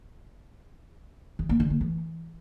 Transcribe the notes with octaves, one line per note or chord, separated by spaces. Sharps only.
D#3
A#3
D3
A#3
E3